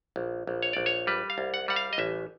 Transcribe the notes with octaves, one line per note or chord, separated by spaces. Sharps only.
A#1
A#1
C#5
A#1 D5
C#5
G3 B4
F5
C2
F#5
G3 F#5
F5
D#5
A1 E5